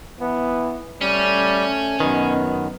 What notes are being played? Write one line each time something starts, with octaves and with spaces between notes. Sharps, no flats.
E3 B3
G3 A3 C#4
F#2 B2 D#3 B3